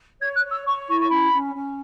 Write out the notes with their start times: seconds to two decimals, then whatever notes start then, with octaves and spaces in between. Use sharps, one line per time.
0.20 C#5 G#6
0.35 F#6
0.43 C#5
0.50 E6
0.66 C#5 C#6
0.88 E4 C#6
0.99 C#6
1.10 C#4 B5
1.33 C#4
1.54 C#4